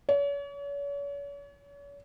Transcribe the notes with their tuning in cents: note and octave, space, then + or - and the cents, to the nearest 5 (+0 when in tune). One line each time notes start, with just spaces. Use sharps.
C#5 +40